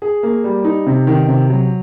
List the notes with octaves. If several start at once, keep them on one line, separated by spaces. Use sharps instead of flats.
G#4
A#3
G3
D#4
C3
D#3
C3
F#3